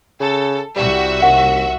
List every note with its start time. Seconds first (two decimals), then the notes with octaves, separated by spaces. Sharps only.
0.20 C#3 A4
0.76 C2 G3 F#4 E5
1.22 D#2 F#5